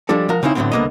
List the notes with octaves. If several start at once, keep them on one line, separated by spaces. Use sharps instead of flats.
F3 G3 G#3 D4 A4
F3 F#4 A#4 A#5
C#3 C4 C#4 D#4 E4
A2 D3 E3 F#3 B3 C4
C2 D3 A#3 B3 D#5